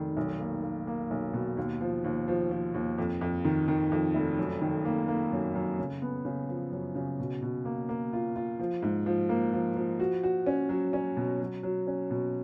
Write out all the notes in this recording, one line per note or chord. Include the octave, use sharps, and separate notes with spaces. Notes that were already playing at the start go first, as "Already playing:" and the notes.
Already playing: F1 D#3
B1
A#3
A#3
A#3
B1
B2
D#2
F3
D#2
F3
F3
D#2
F2
F2
D#3
D#3
F2
F1
F#2
D#3
A#3
A#3
F#2
F#2
C#3
B3
C#3
F3
F#2
C#3
B2
B2
A#3
A#3
F4
F4
F3
G#2
F3
A#3
F3
F3
F#4
F#4
C#4
F#3
C#4
B2
F#3
F#3
C#4
B2